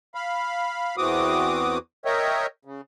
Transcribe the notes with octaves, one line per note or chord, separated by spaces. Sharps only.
F5 B5
E2 E3 C4 F#4 D6 D#6
A#4 C#5 D#5 E5 G5
C#3